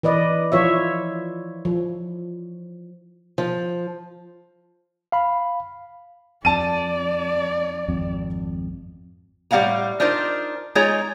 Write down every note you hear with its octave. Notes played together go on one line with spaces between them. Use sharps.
E3 B4 D5 D#5
F3 E4 F4 C#5 E5
F3
F3
F5 B5
F2 D5 A5 D#7
G#1 F2
A2 G3 C4 F5 F#5 A#5
D4 D#4 F4 A#4 C5
G#3 D#4 F4 G#4 C#5 A#5